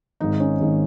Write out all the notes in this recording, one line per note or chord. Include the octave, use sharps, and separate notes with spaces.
G#1 G#2 D#3 D#4
C#4
G#1 G#2 D#3